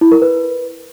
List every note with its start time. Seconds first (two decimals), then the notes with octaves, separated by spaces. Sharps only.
0.01 E4
0.12 A#4
0.22 B4